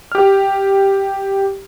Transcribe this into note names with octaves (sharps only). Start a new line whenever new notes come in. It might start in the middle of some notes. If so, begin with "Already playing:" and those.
G4 F6